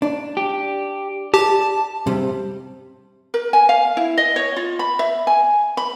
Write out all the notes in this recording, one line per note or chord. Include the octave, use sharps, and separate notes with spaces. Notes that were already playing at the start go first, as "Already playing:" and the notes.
D4
G4
G4 A5
C3 G3
A#4
G#5
F5
E4
D#5
C#5
F4
B5
E5
G#5
B5